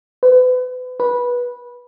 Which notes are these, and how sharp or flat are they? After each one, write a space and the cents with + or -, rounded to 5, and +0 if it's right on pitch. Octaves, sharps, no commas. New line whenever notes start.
B4 +35
B4 -15